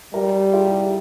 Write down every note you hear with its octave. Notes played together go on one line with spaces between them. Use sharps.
G3 G4 A#4
F4 G#4
E4 G4